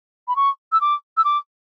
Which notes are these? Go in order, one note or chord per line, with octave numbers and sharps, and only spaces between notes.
B5
C#6
E6
D6
E6
D6